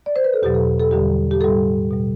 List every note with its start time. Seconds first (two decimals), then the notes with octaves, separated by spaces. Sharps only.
0.06 D5
0.16 C5
0.24 B4
0.33 A4
0.43 E2 B2 F#3 G4
0.55 A4
0.80 A4
0.91 E2 D3 G3 G4
1.31 G4
1.41 A2 G3 A4
1.90 B2 G3